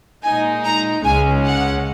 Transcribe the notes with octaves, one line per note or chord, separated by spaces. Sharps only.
A#2 G#3 D#4 G#5
A#5
C#2 C#3 G#3 C#4 G#5
F#5